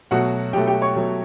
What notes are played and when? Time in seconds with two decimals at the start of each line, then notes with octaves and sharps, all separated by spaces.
0.11 B2 F#3 A3 F#4 F#5
0.53 B2 F#3 A3 G4 G5
0.67 G4 G5
0.82 C#5 C#6
0.96 B2 F#3 A3